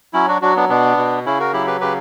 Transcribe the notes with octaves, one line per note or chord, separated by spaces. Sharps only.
F#3 C#4 E4
D4 F#4
F#3 D4 F#4
B3 D4
B2 B3 D4
B2
C#3 C#4 E4
F#4 A#4
F#3 E4 G4
G4 B4
C#3 G4 B4